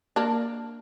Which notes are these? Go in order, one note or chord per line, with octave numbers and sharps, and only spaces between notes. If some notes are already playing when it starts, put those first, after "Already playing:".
A#3 D4